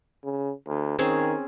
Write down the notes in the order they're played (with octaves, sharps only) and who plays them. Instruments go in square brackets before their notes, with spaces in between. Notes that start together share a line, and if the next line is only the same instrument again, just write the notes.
[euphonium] C#3
D2
[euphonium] D#3 [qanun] C4 C#4 G#4